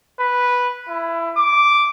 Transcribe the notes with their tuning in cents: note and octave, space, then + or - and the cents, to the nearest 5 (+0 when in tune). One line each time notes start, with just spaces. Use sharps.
B4 -5
E4 +20
D6 -5